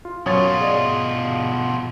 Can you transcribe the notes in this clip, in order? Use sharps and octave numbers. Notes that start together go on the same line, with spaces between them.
F4
F#2 B2 F4 C#5 A6
G#4 D5 D#5